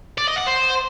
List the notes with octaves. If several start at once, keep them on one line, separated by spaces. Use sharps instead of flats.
D5
D#5
F#5
C5